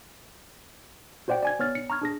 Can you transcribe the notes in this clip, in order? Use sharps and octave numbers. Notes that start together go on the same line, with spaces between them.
F#4 C5 D5 F#5 G5
D5 G#5 G#6
B3 C#5 F6 A6
C#7
A#5 C#6 F6 G#6
D4 G#4 A#6